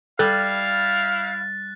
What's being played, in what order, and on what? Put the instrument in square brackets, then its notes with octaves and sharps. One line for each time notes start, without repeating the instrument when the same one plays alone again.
[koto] G3 [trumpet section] E4 F5 [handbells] A4 [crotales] F#6 A6